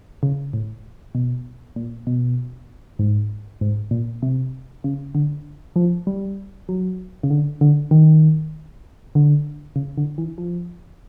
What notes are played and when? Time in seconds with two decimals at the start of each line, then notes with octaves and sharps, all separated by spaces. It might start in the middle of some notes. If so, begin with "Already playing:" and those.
0.23 C#3
0.53 A2
1.15 B2
1.76 A#2
2.07 B2
2.99 G#2
3.61 G#2
3.91 A#2
4.23 C3
4.84 C#3
5.15 D3
5.76 F3
6.07 G3
6.69 F#3
7.23 C#3
7.30 D3
7.61 D3
7.91 D#3
9.15 D3
9.76 C#3
9.98 D3
10.18 E3
10.38 F3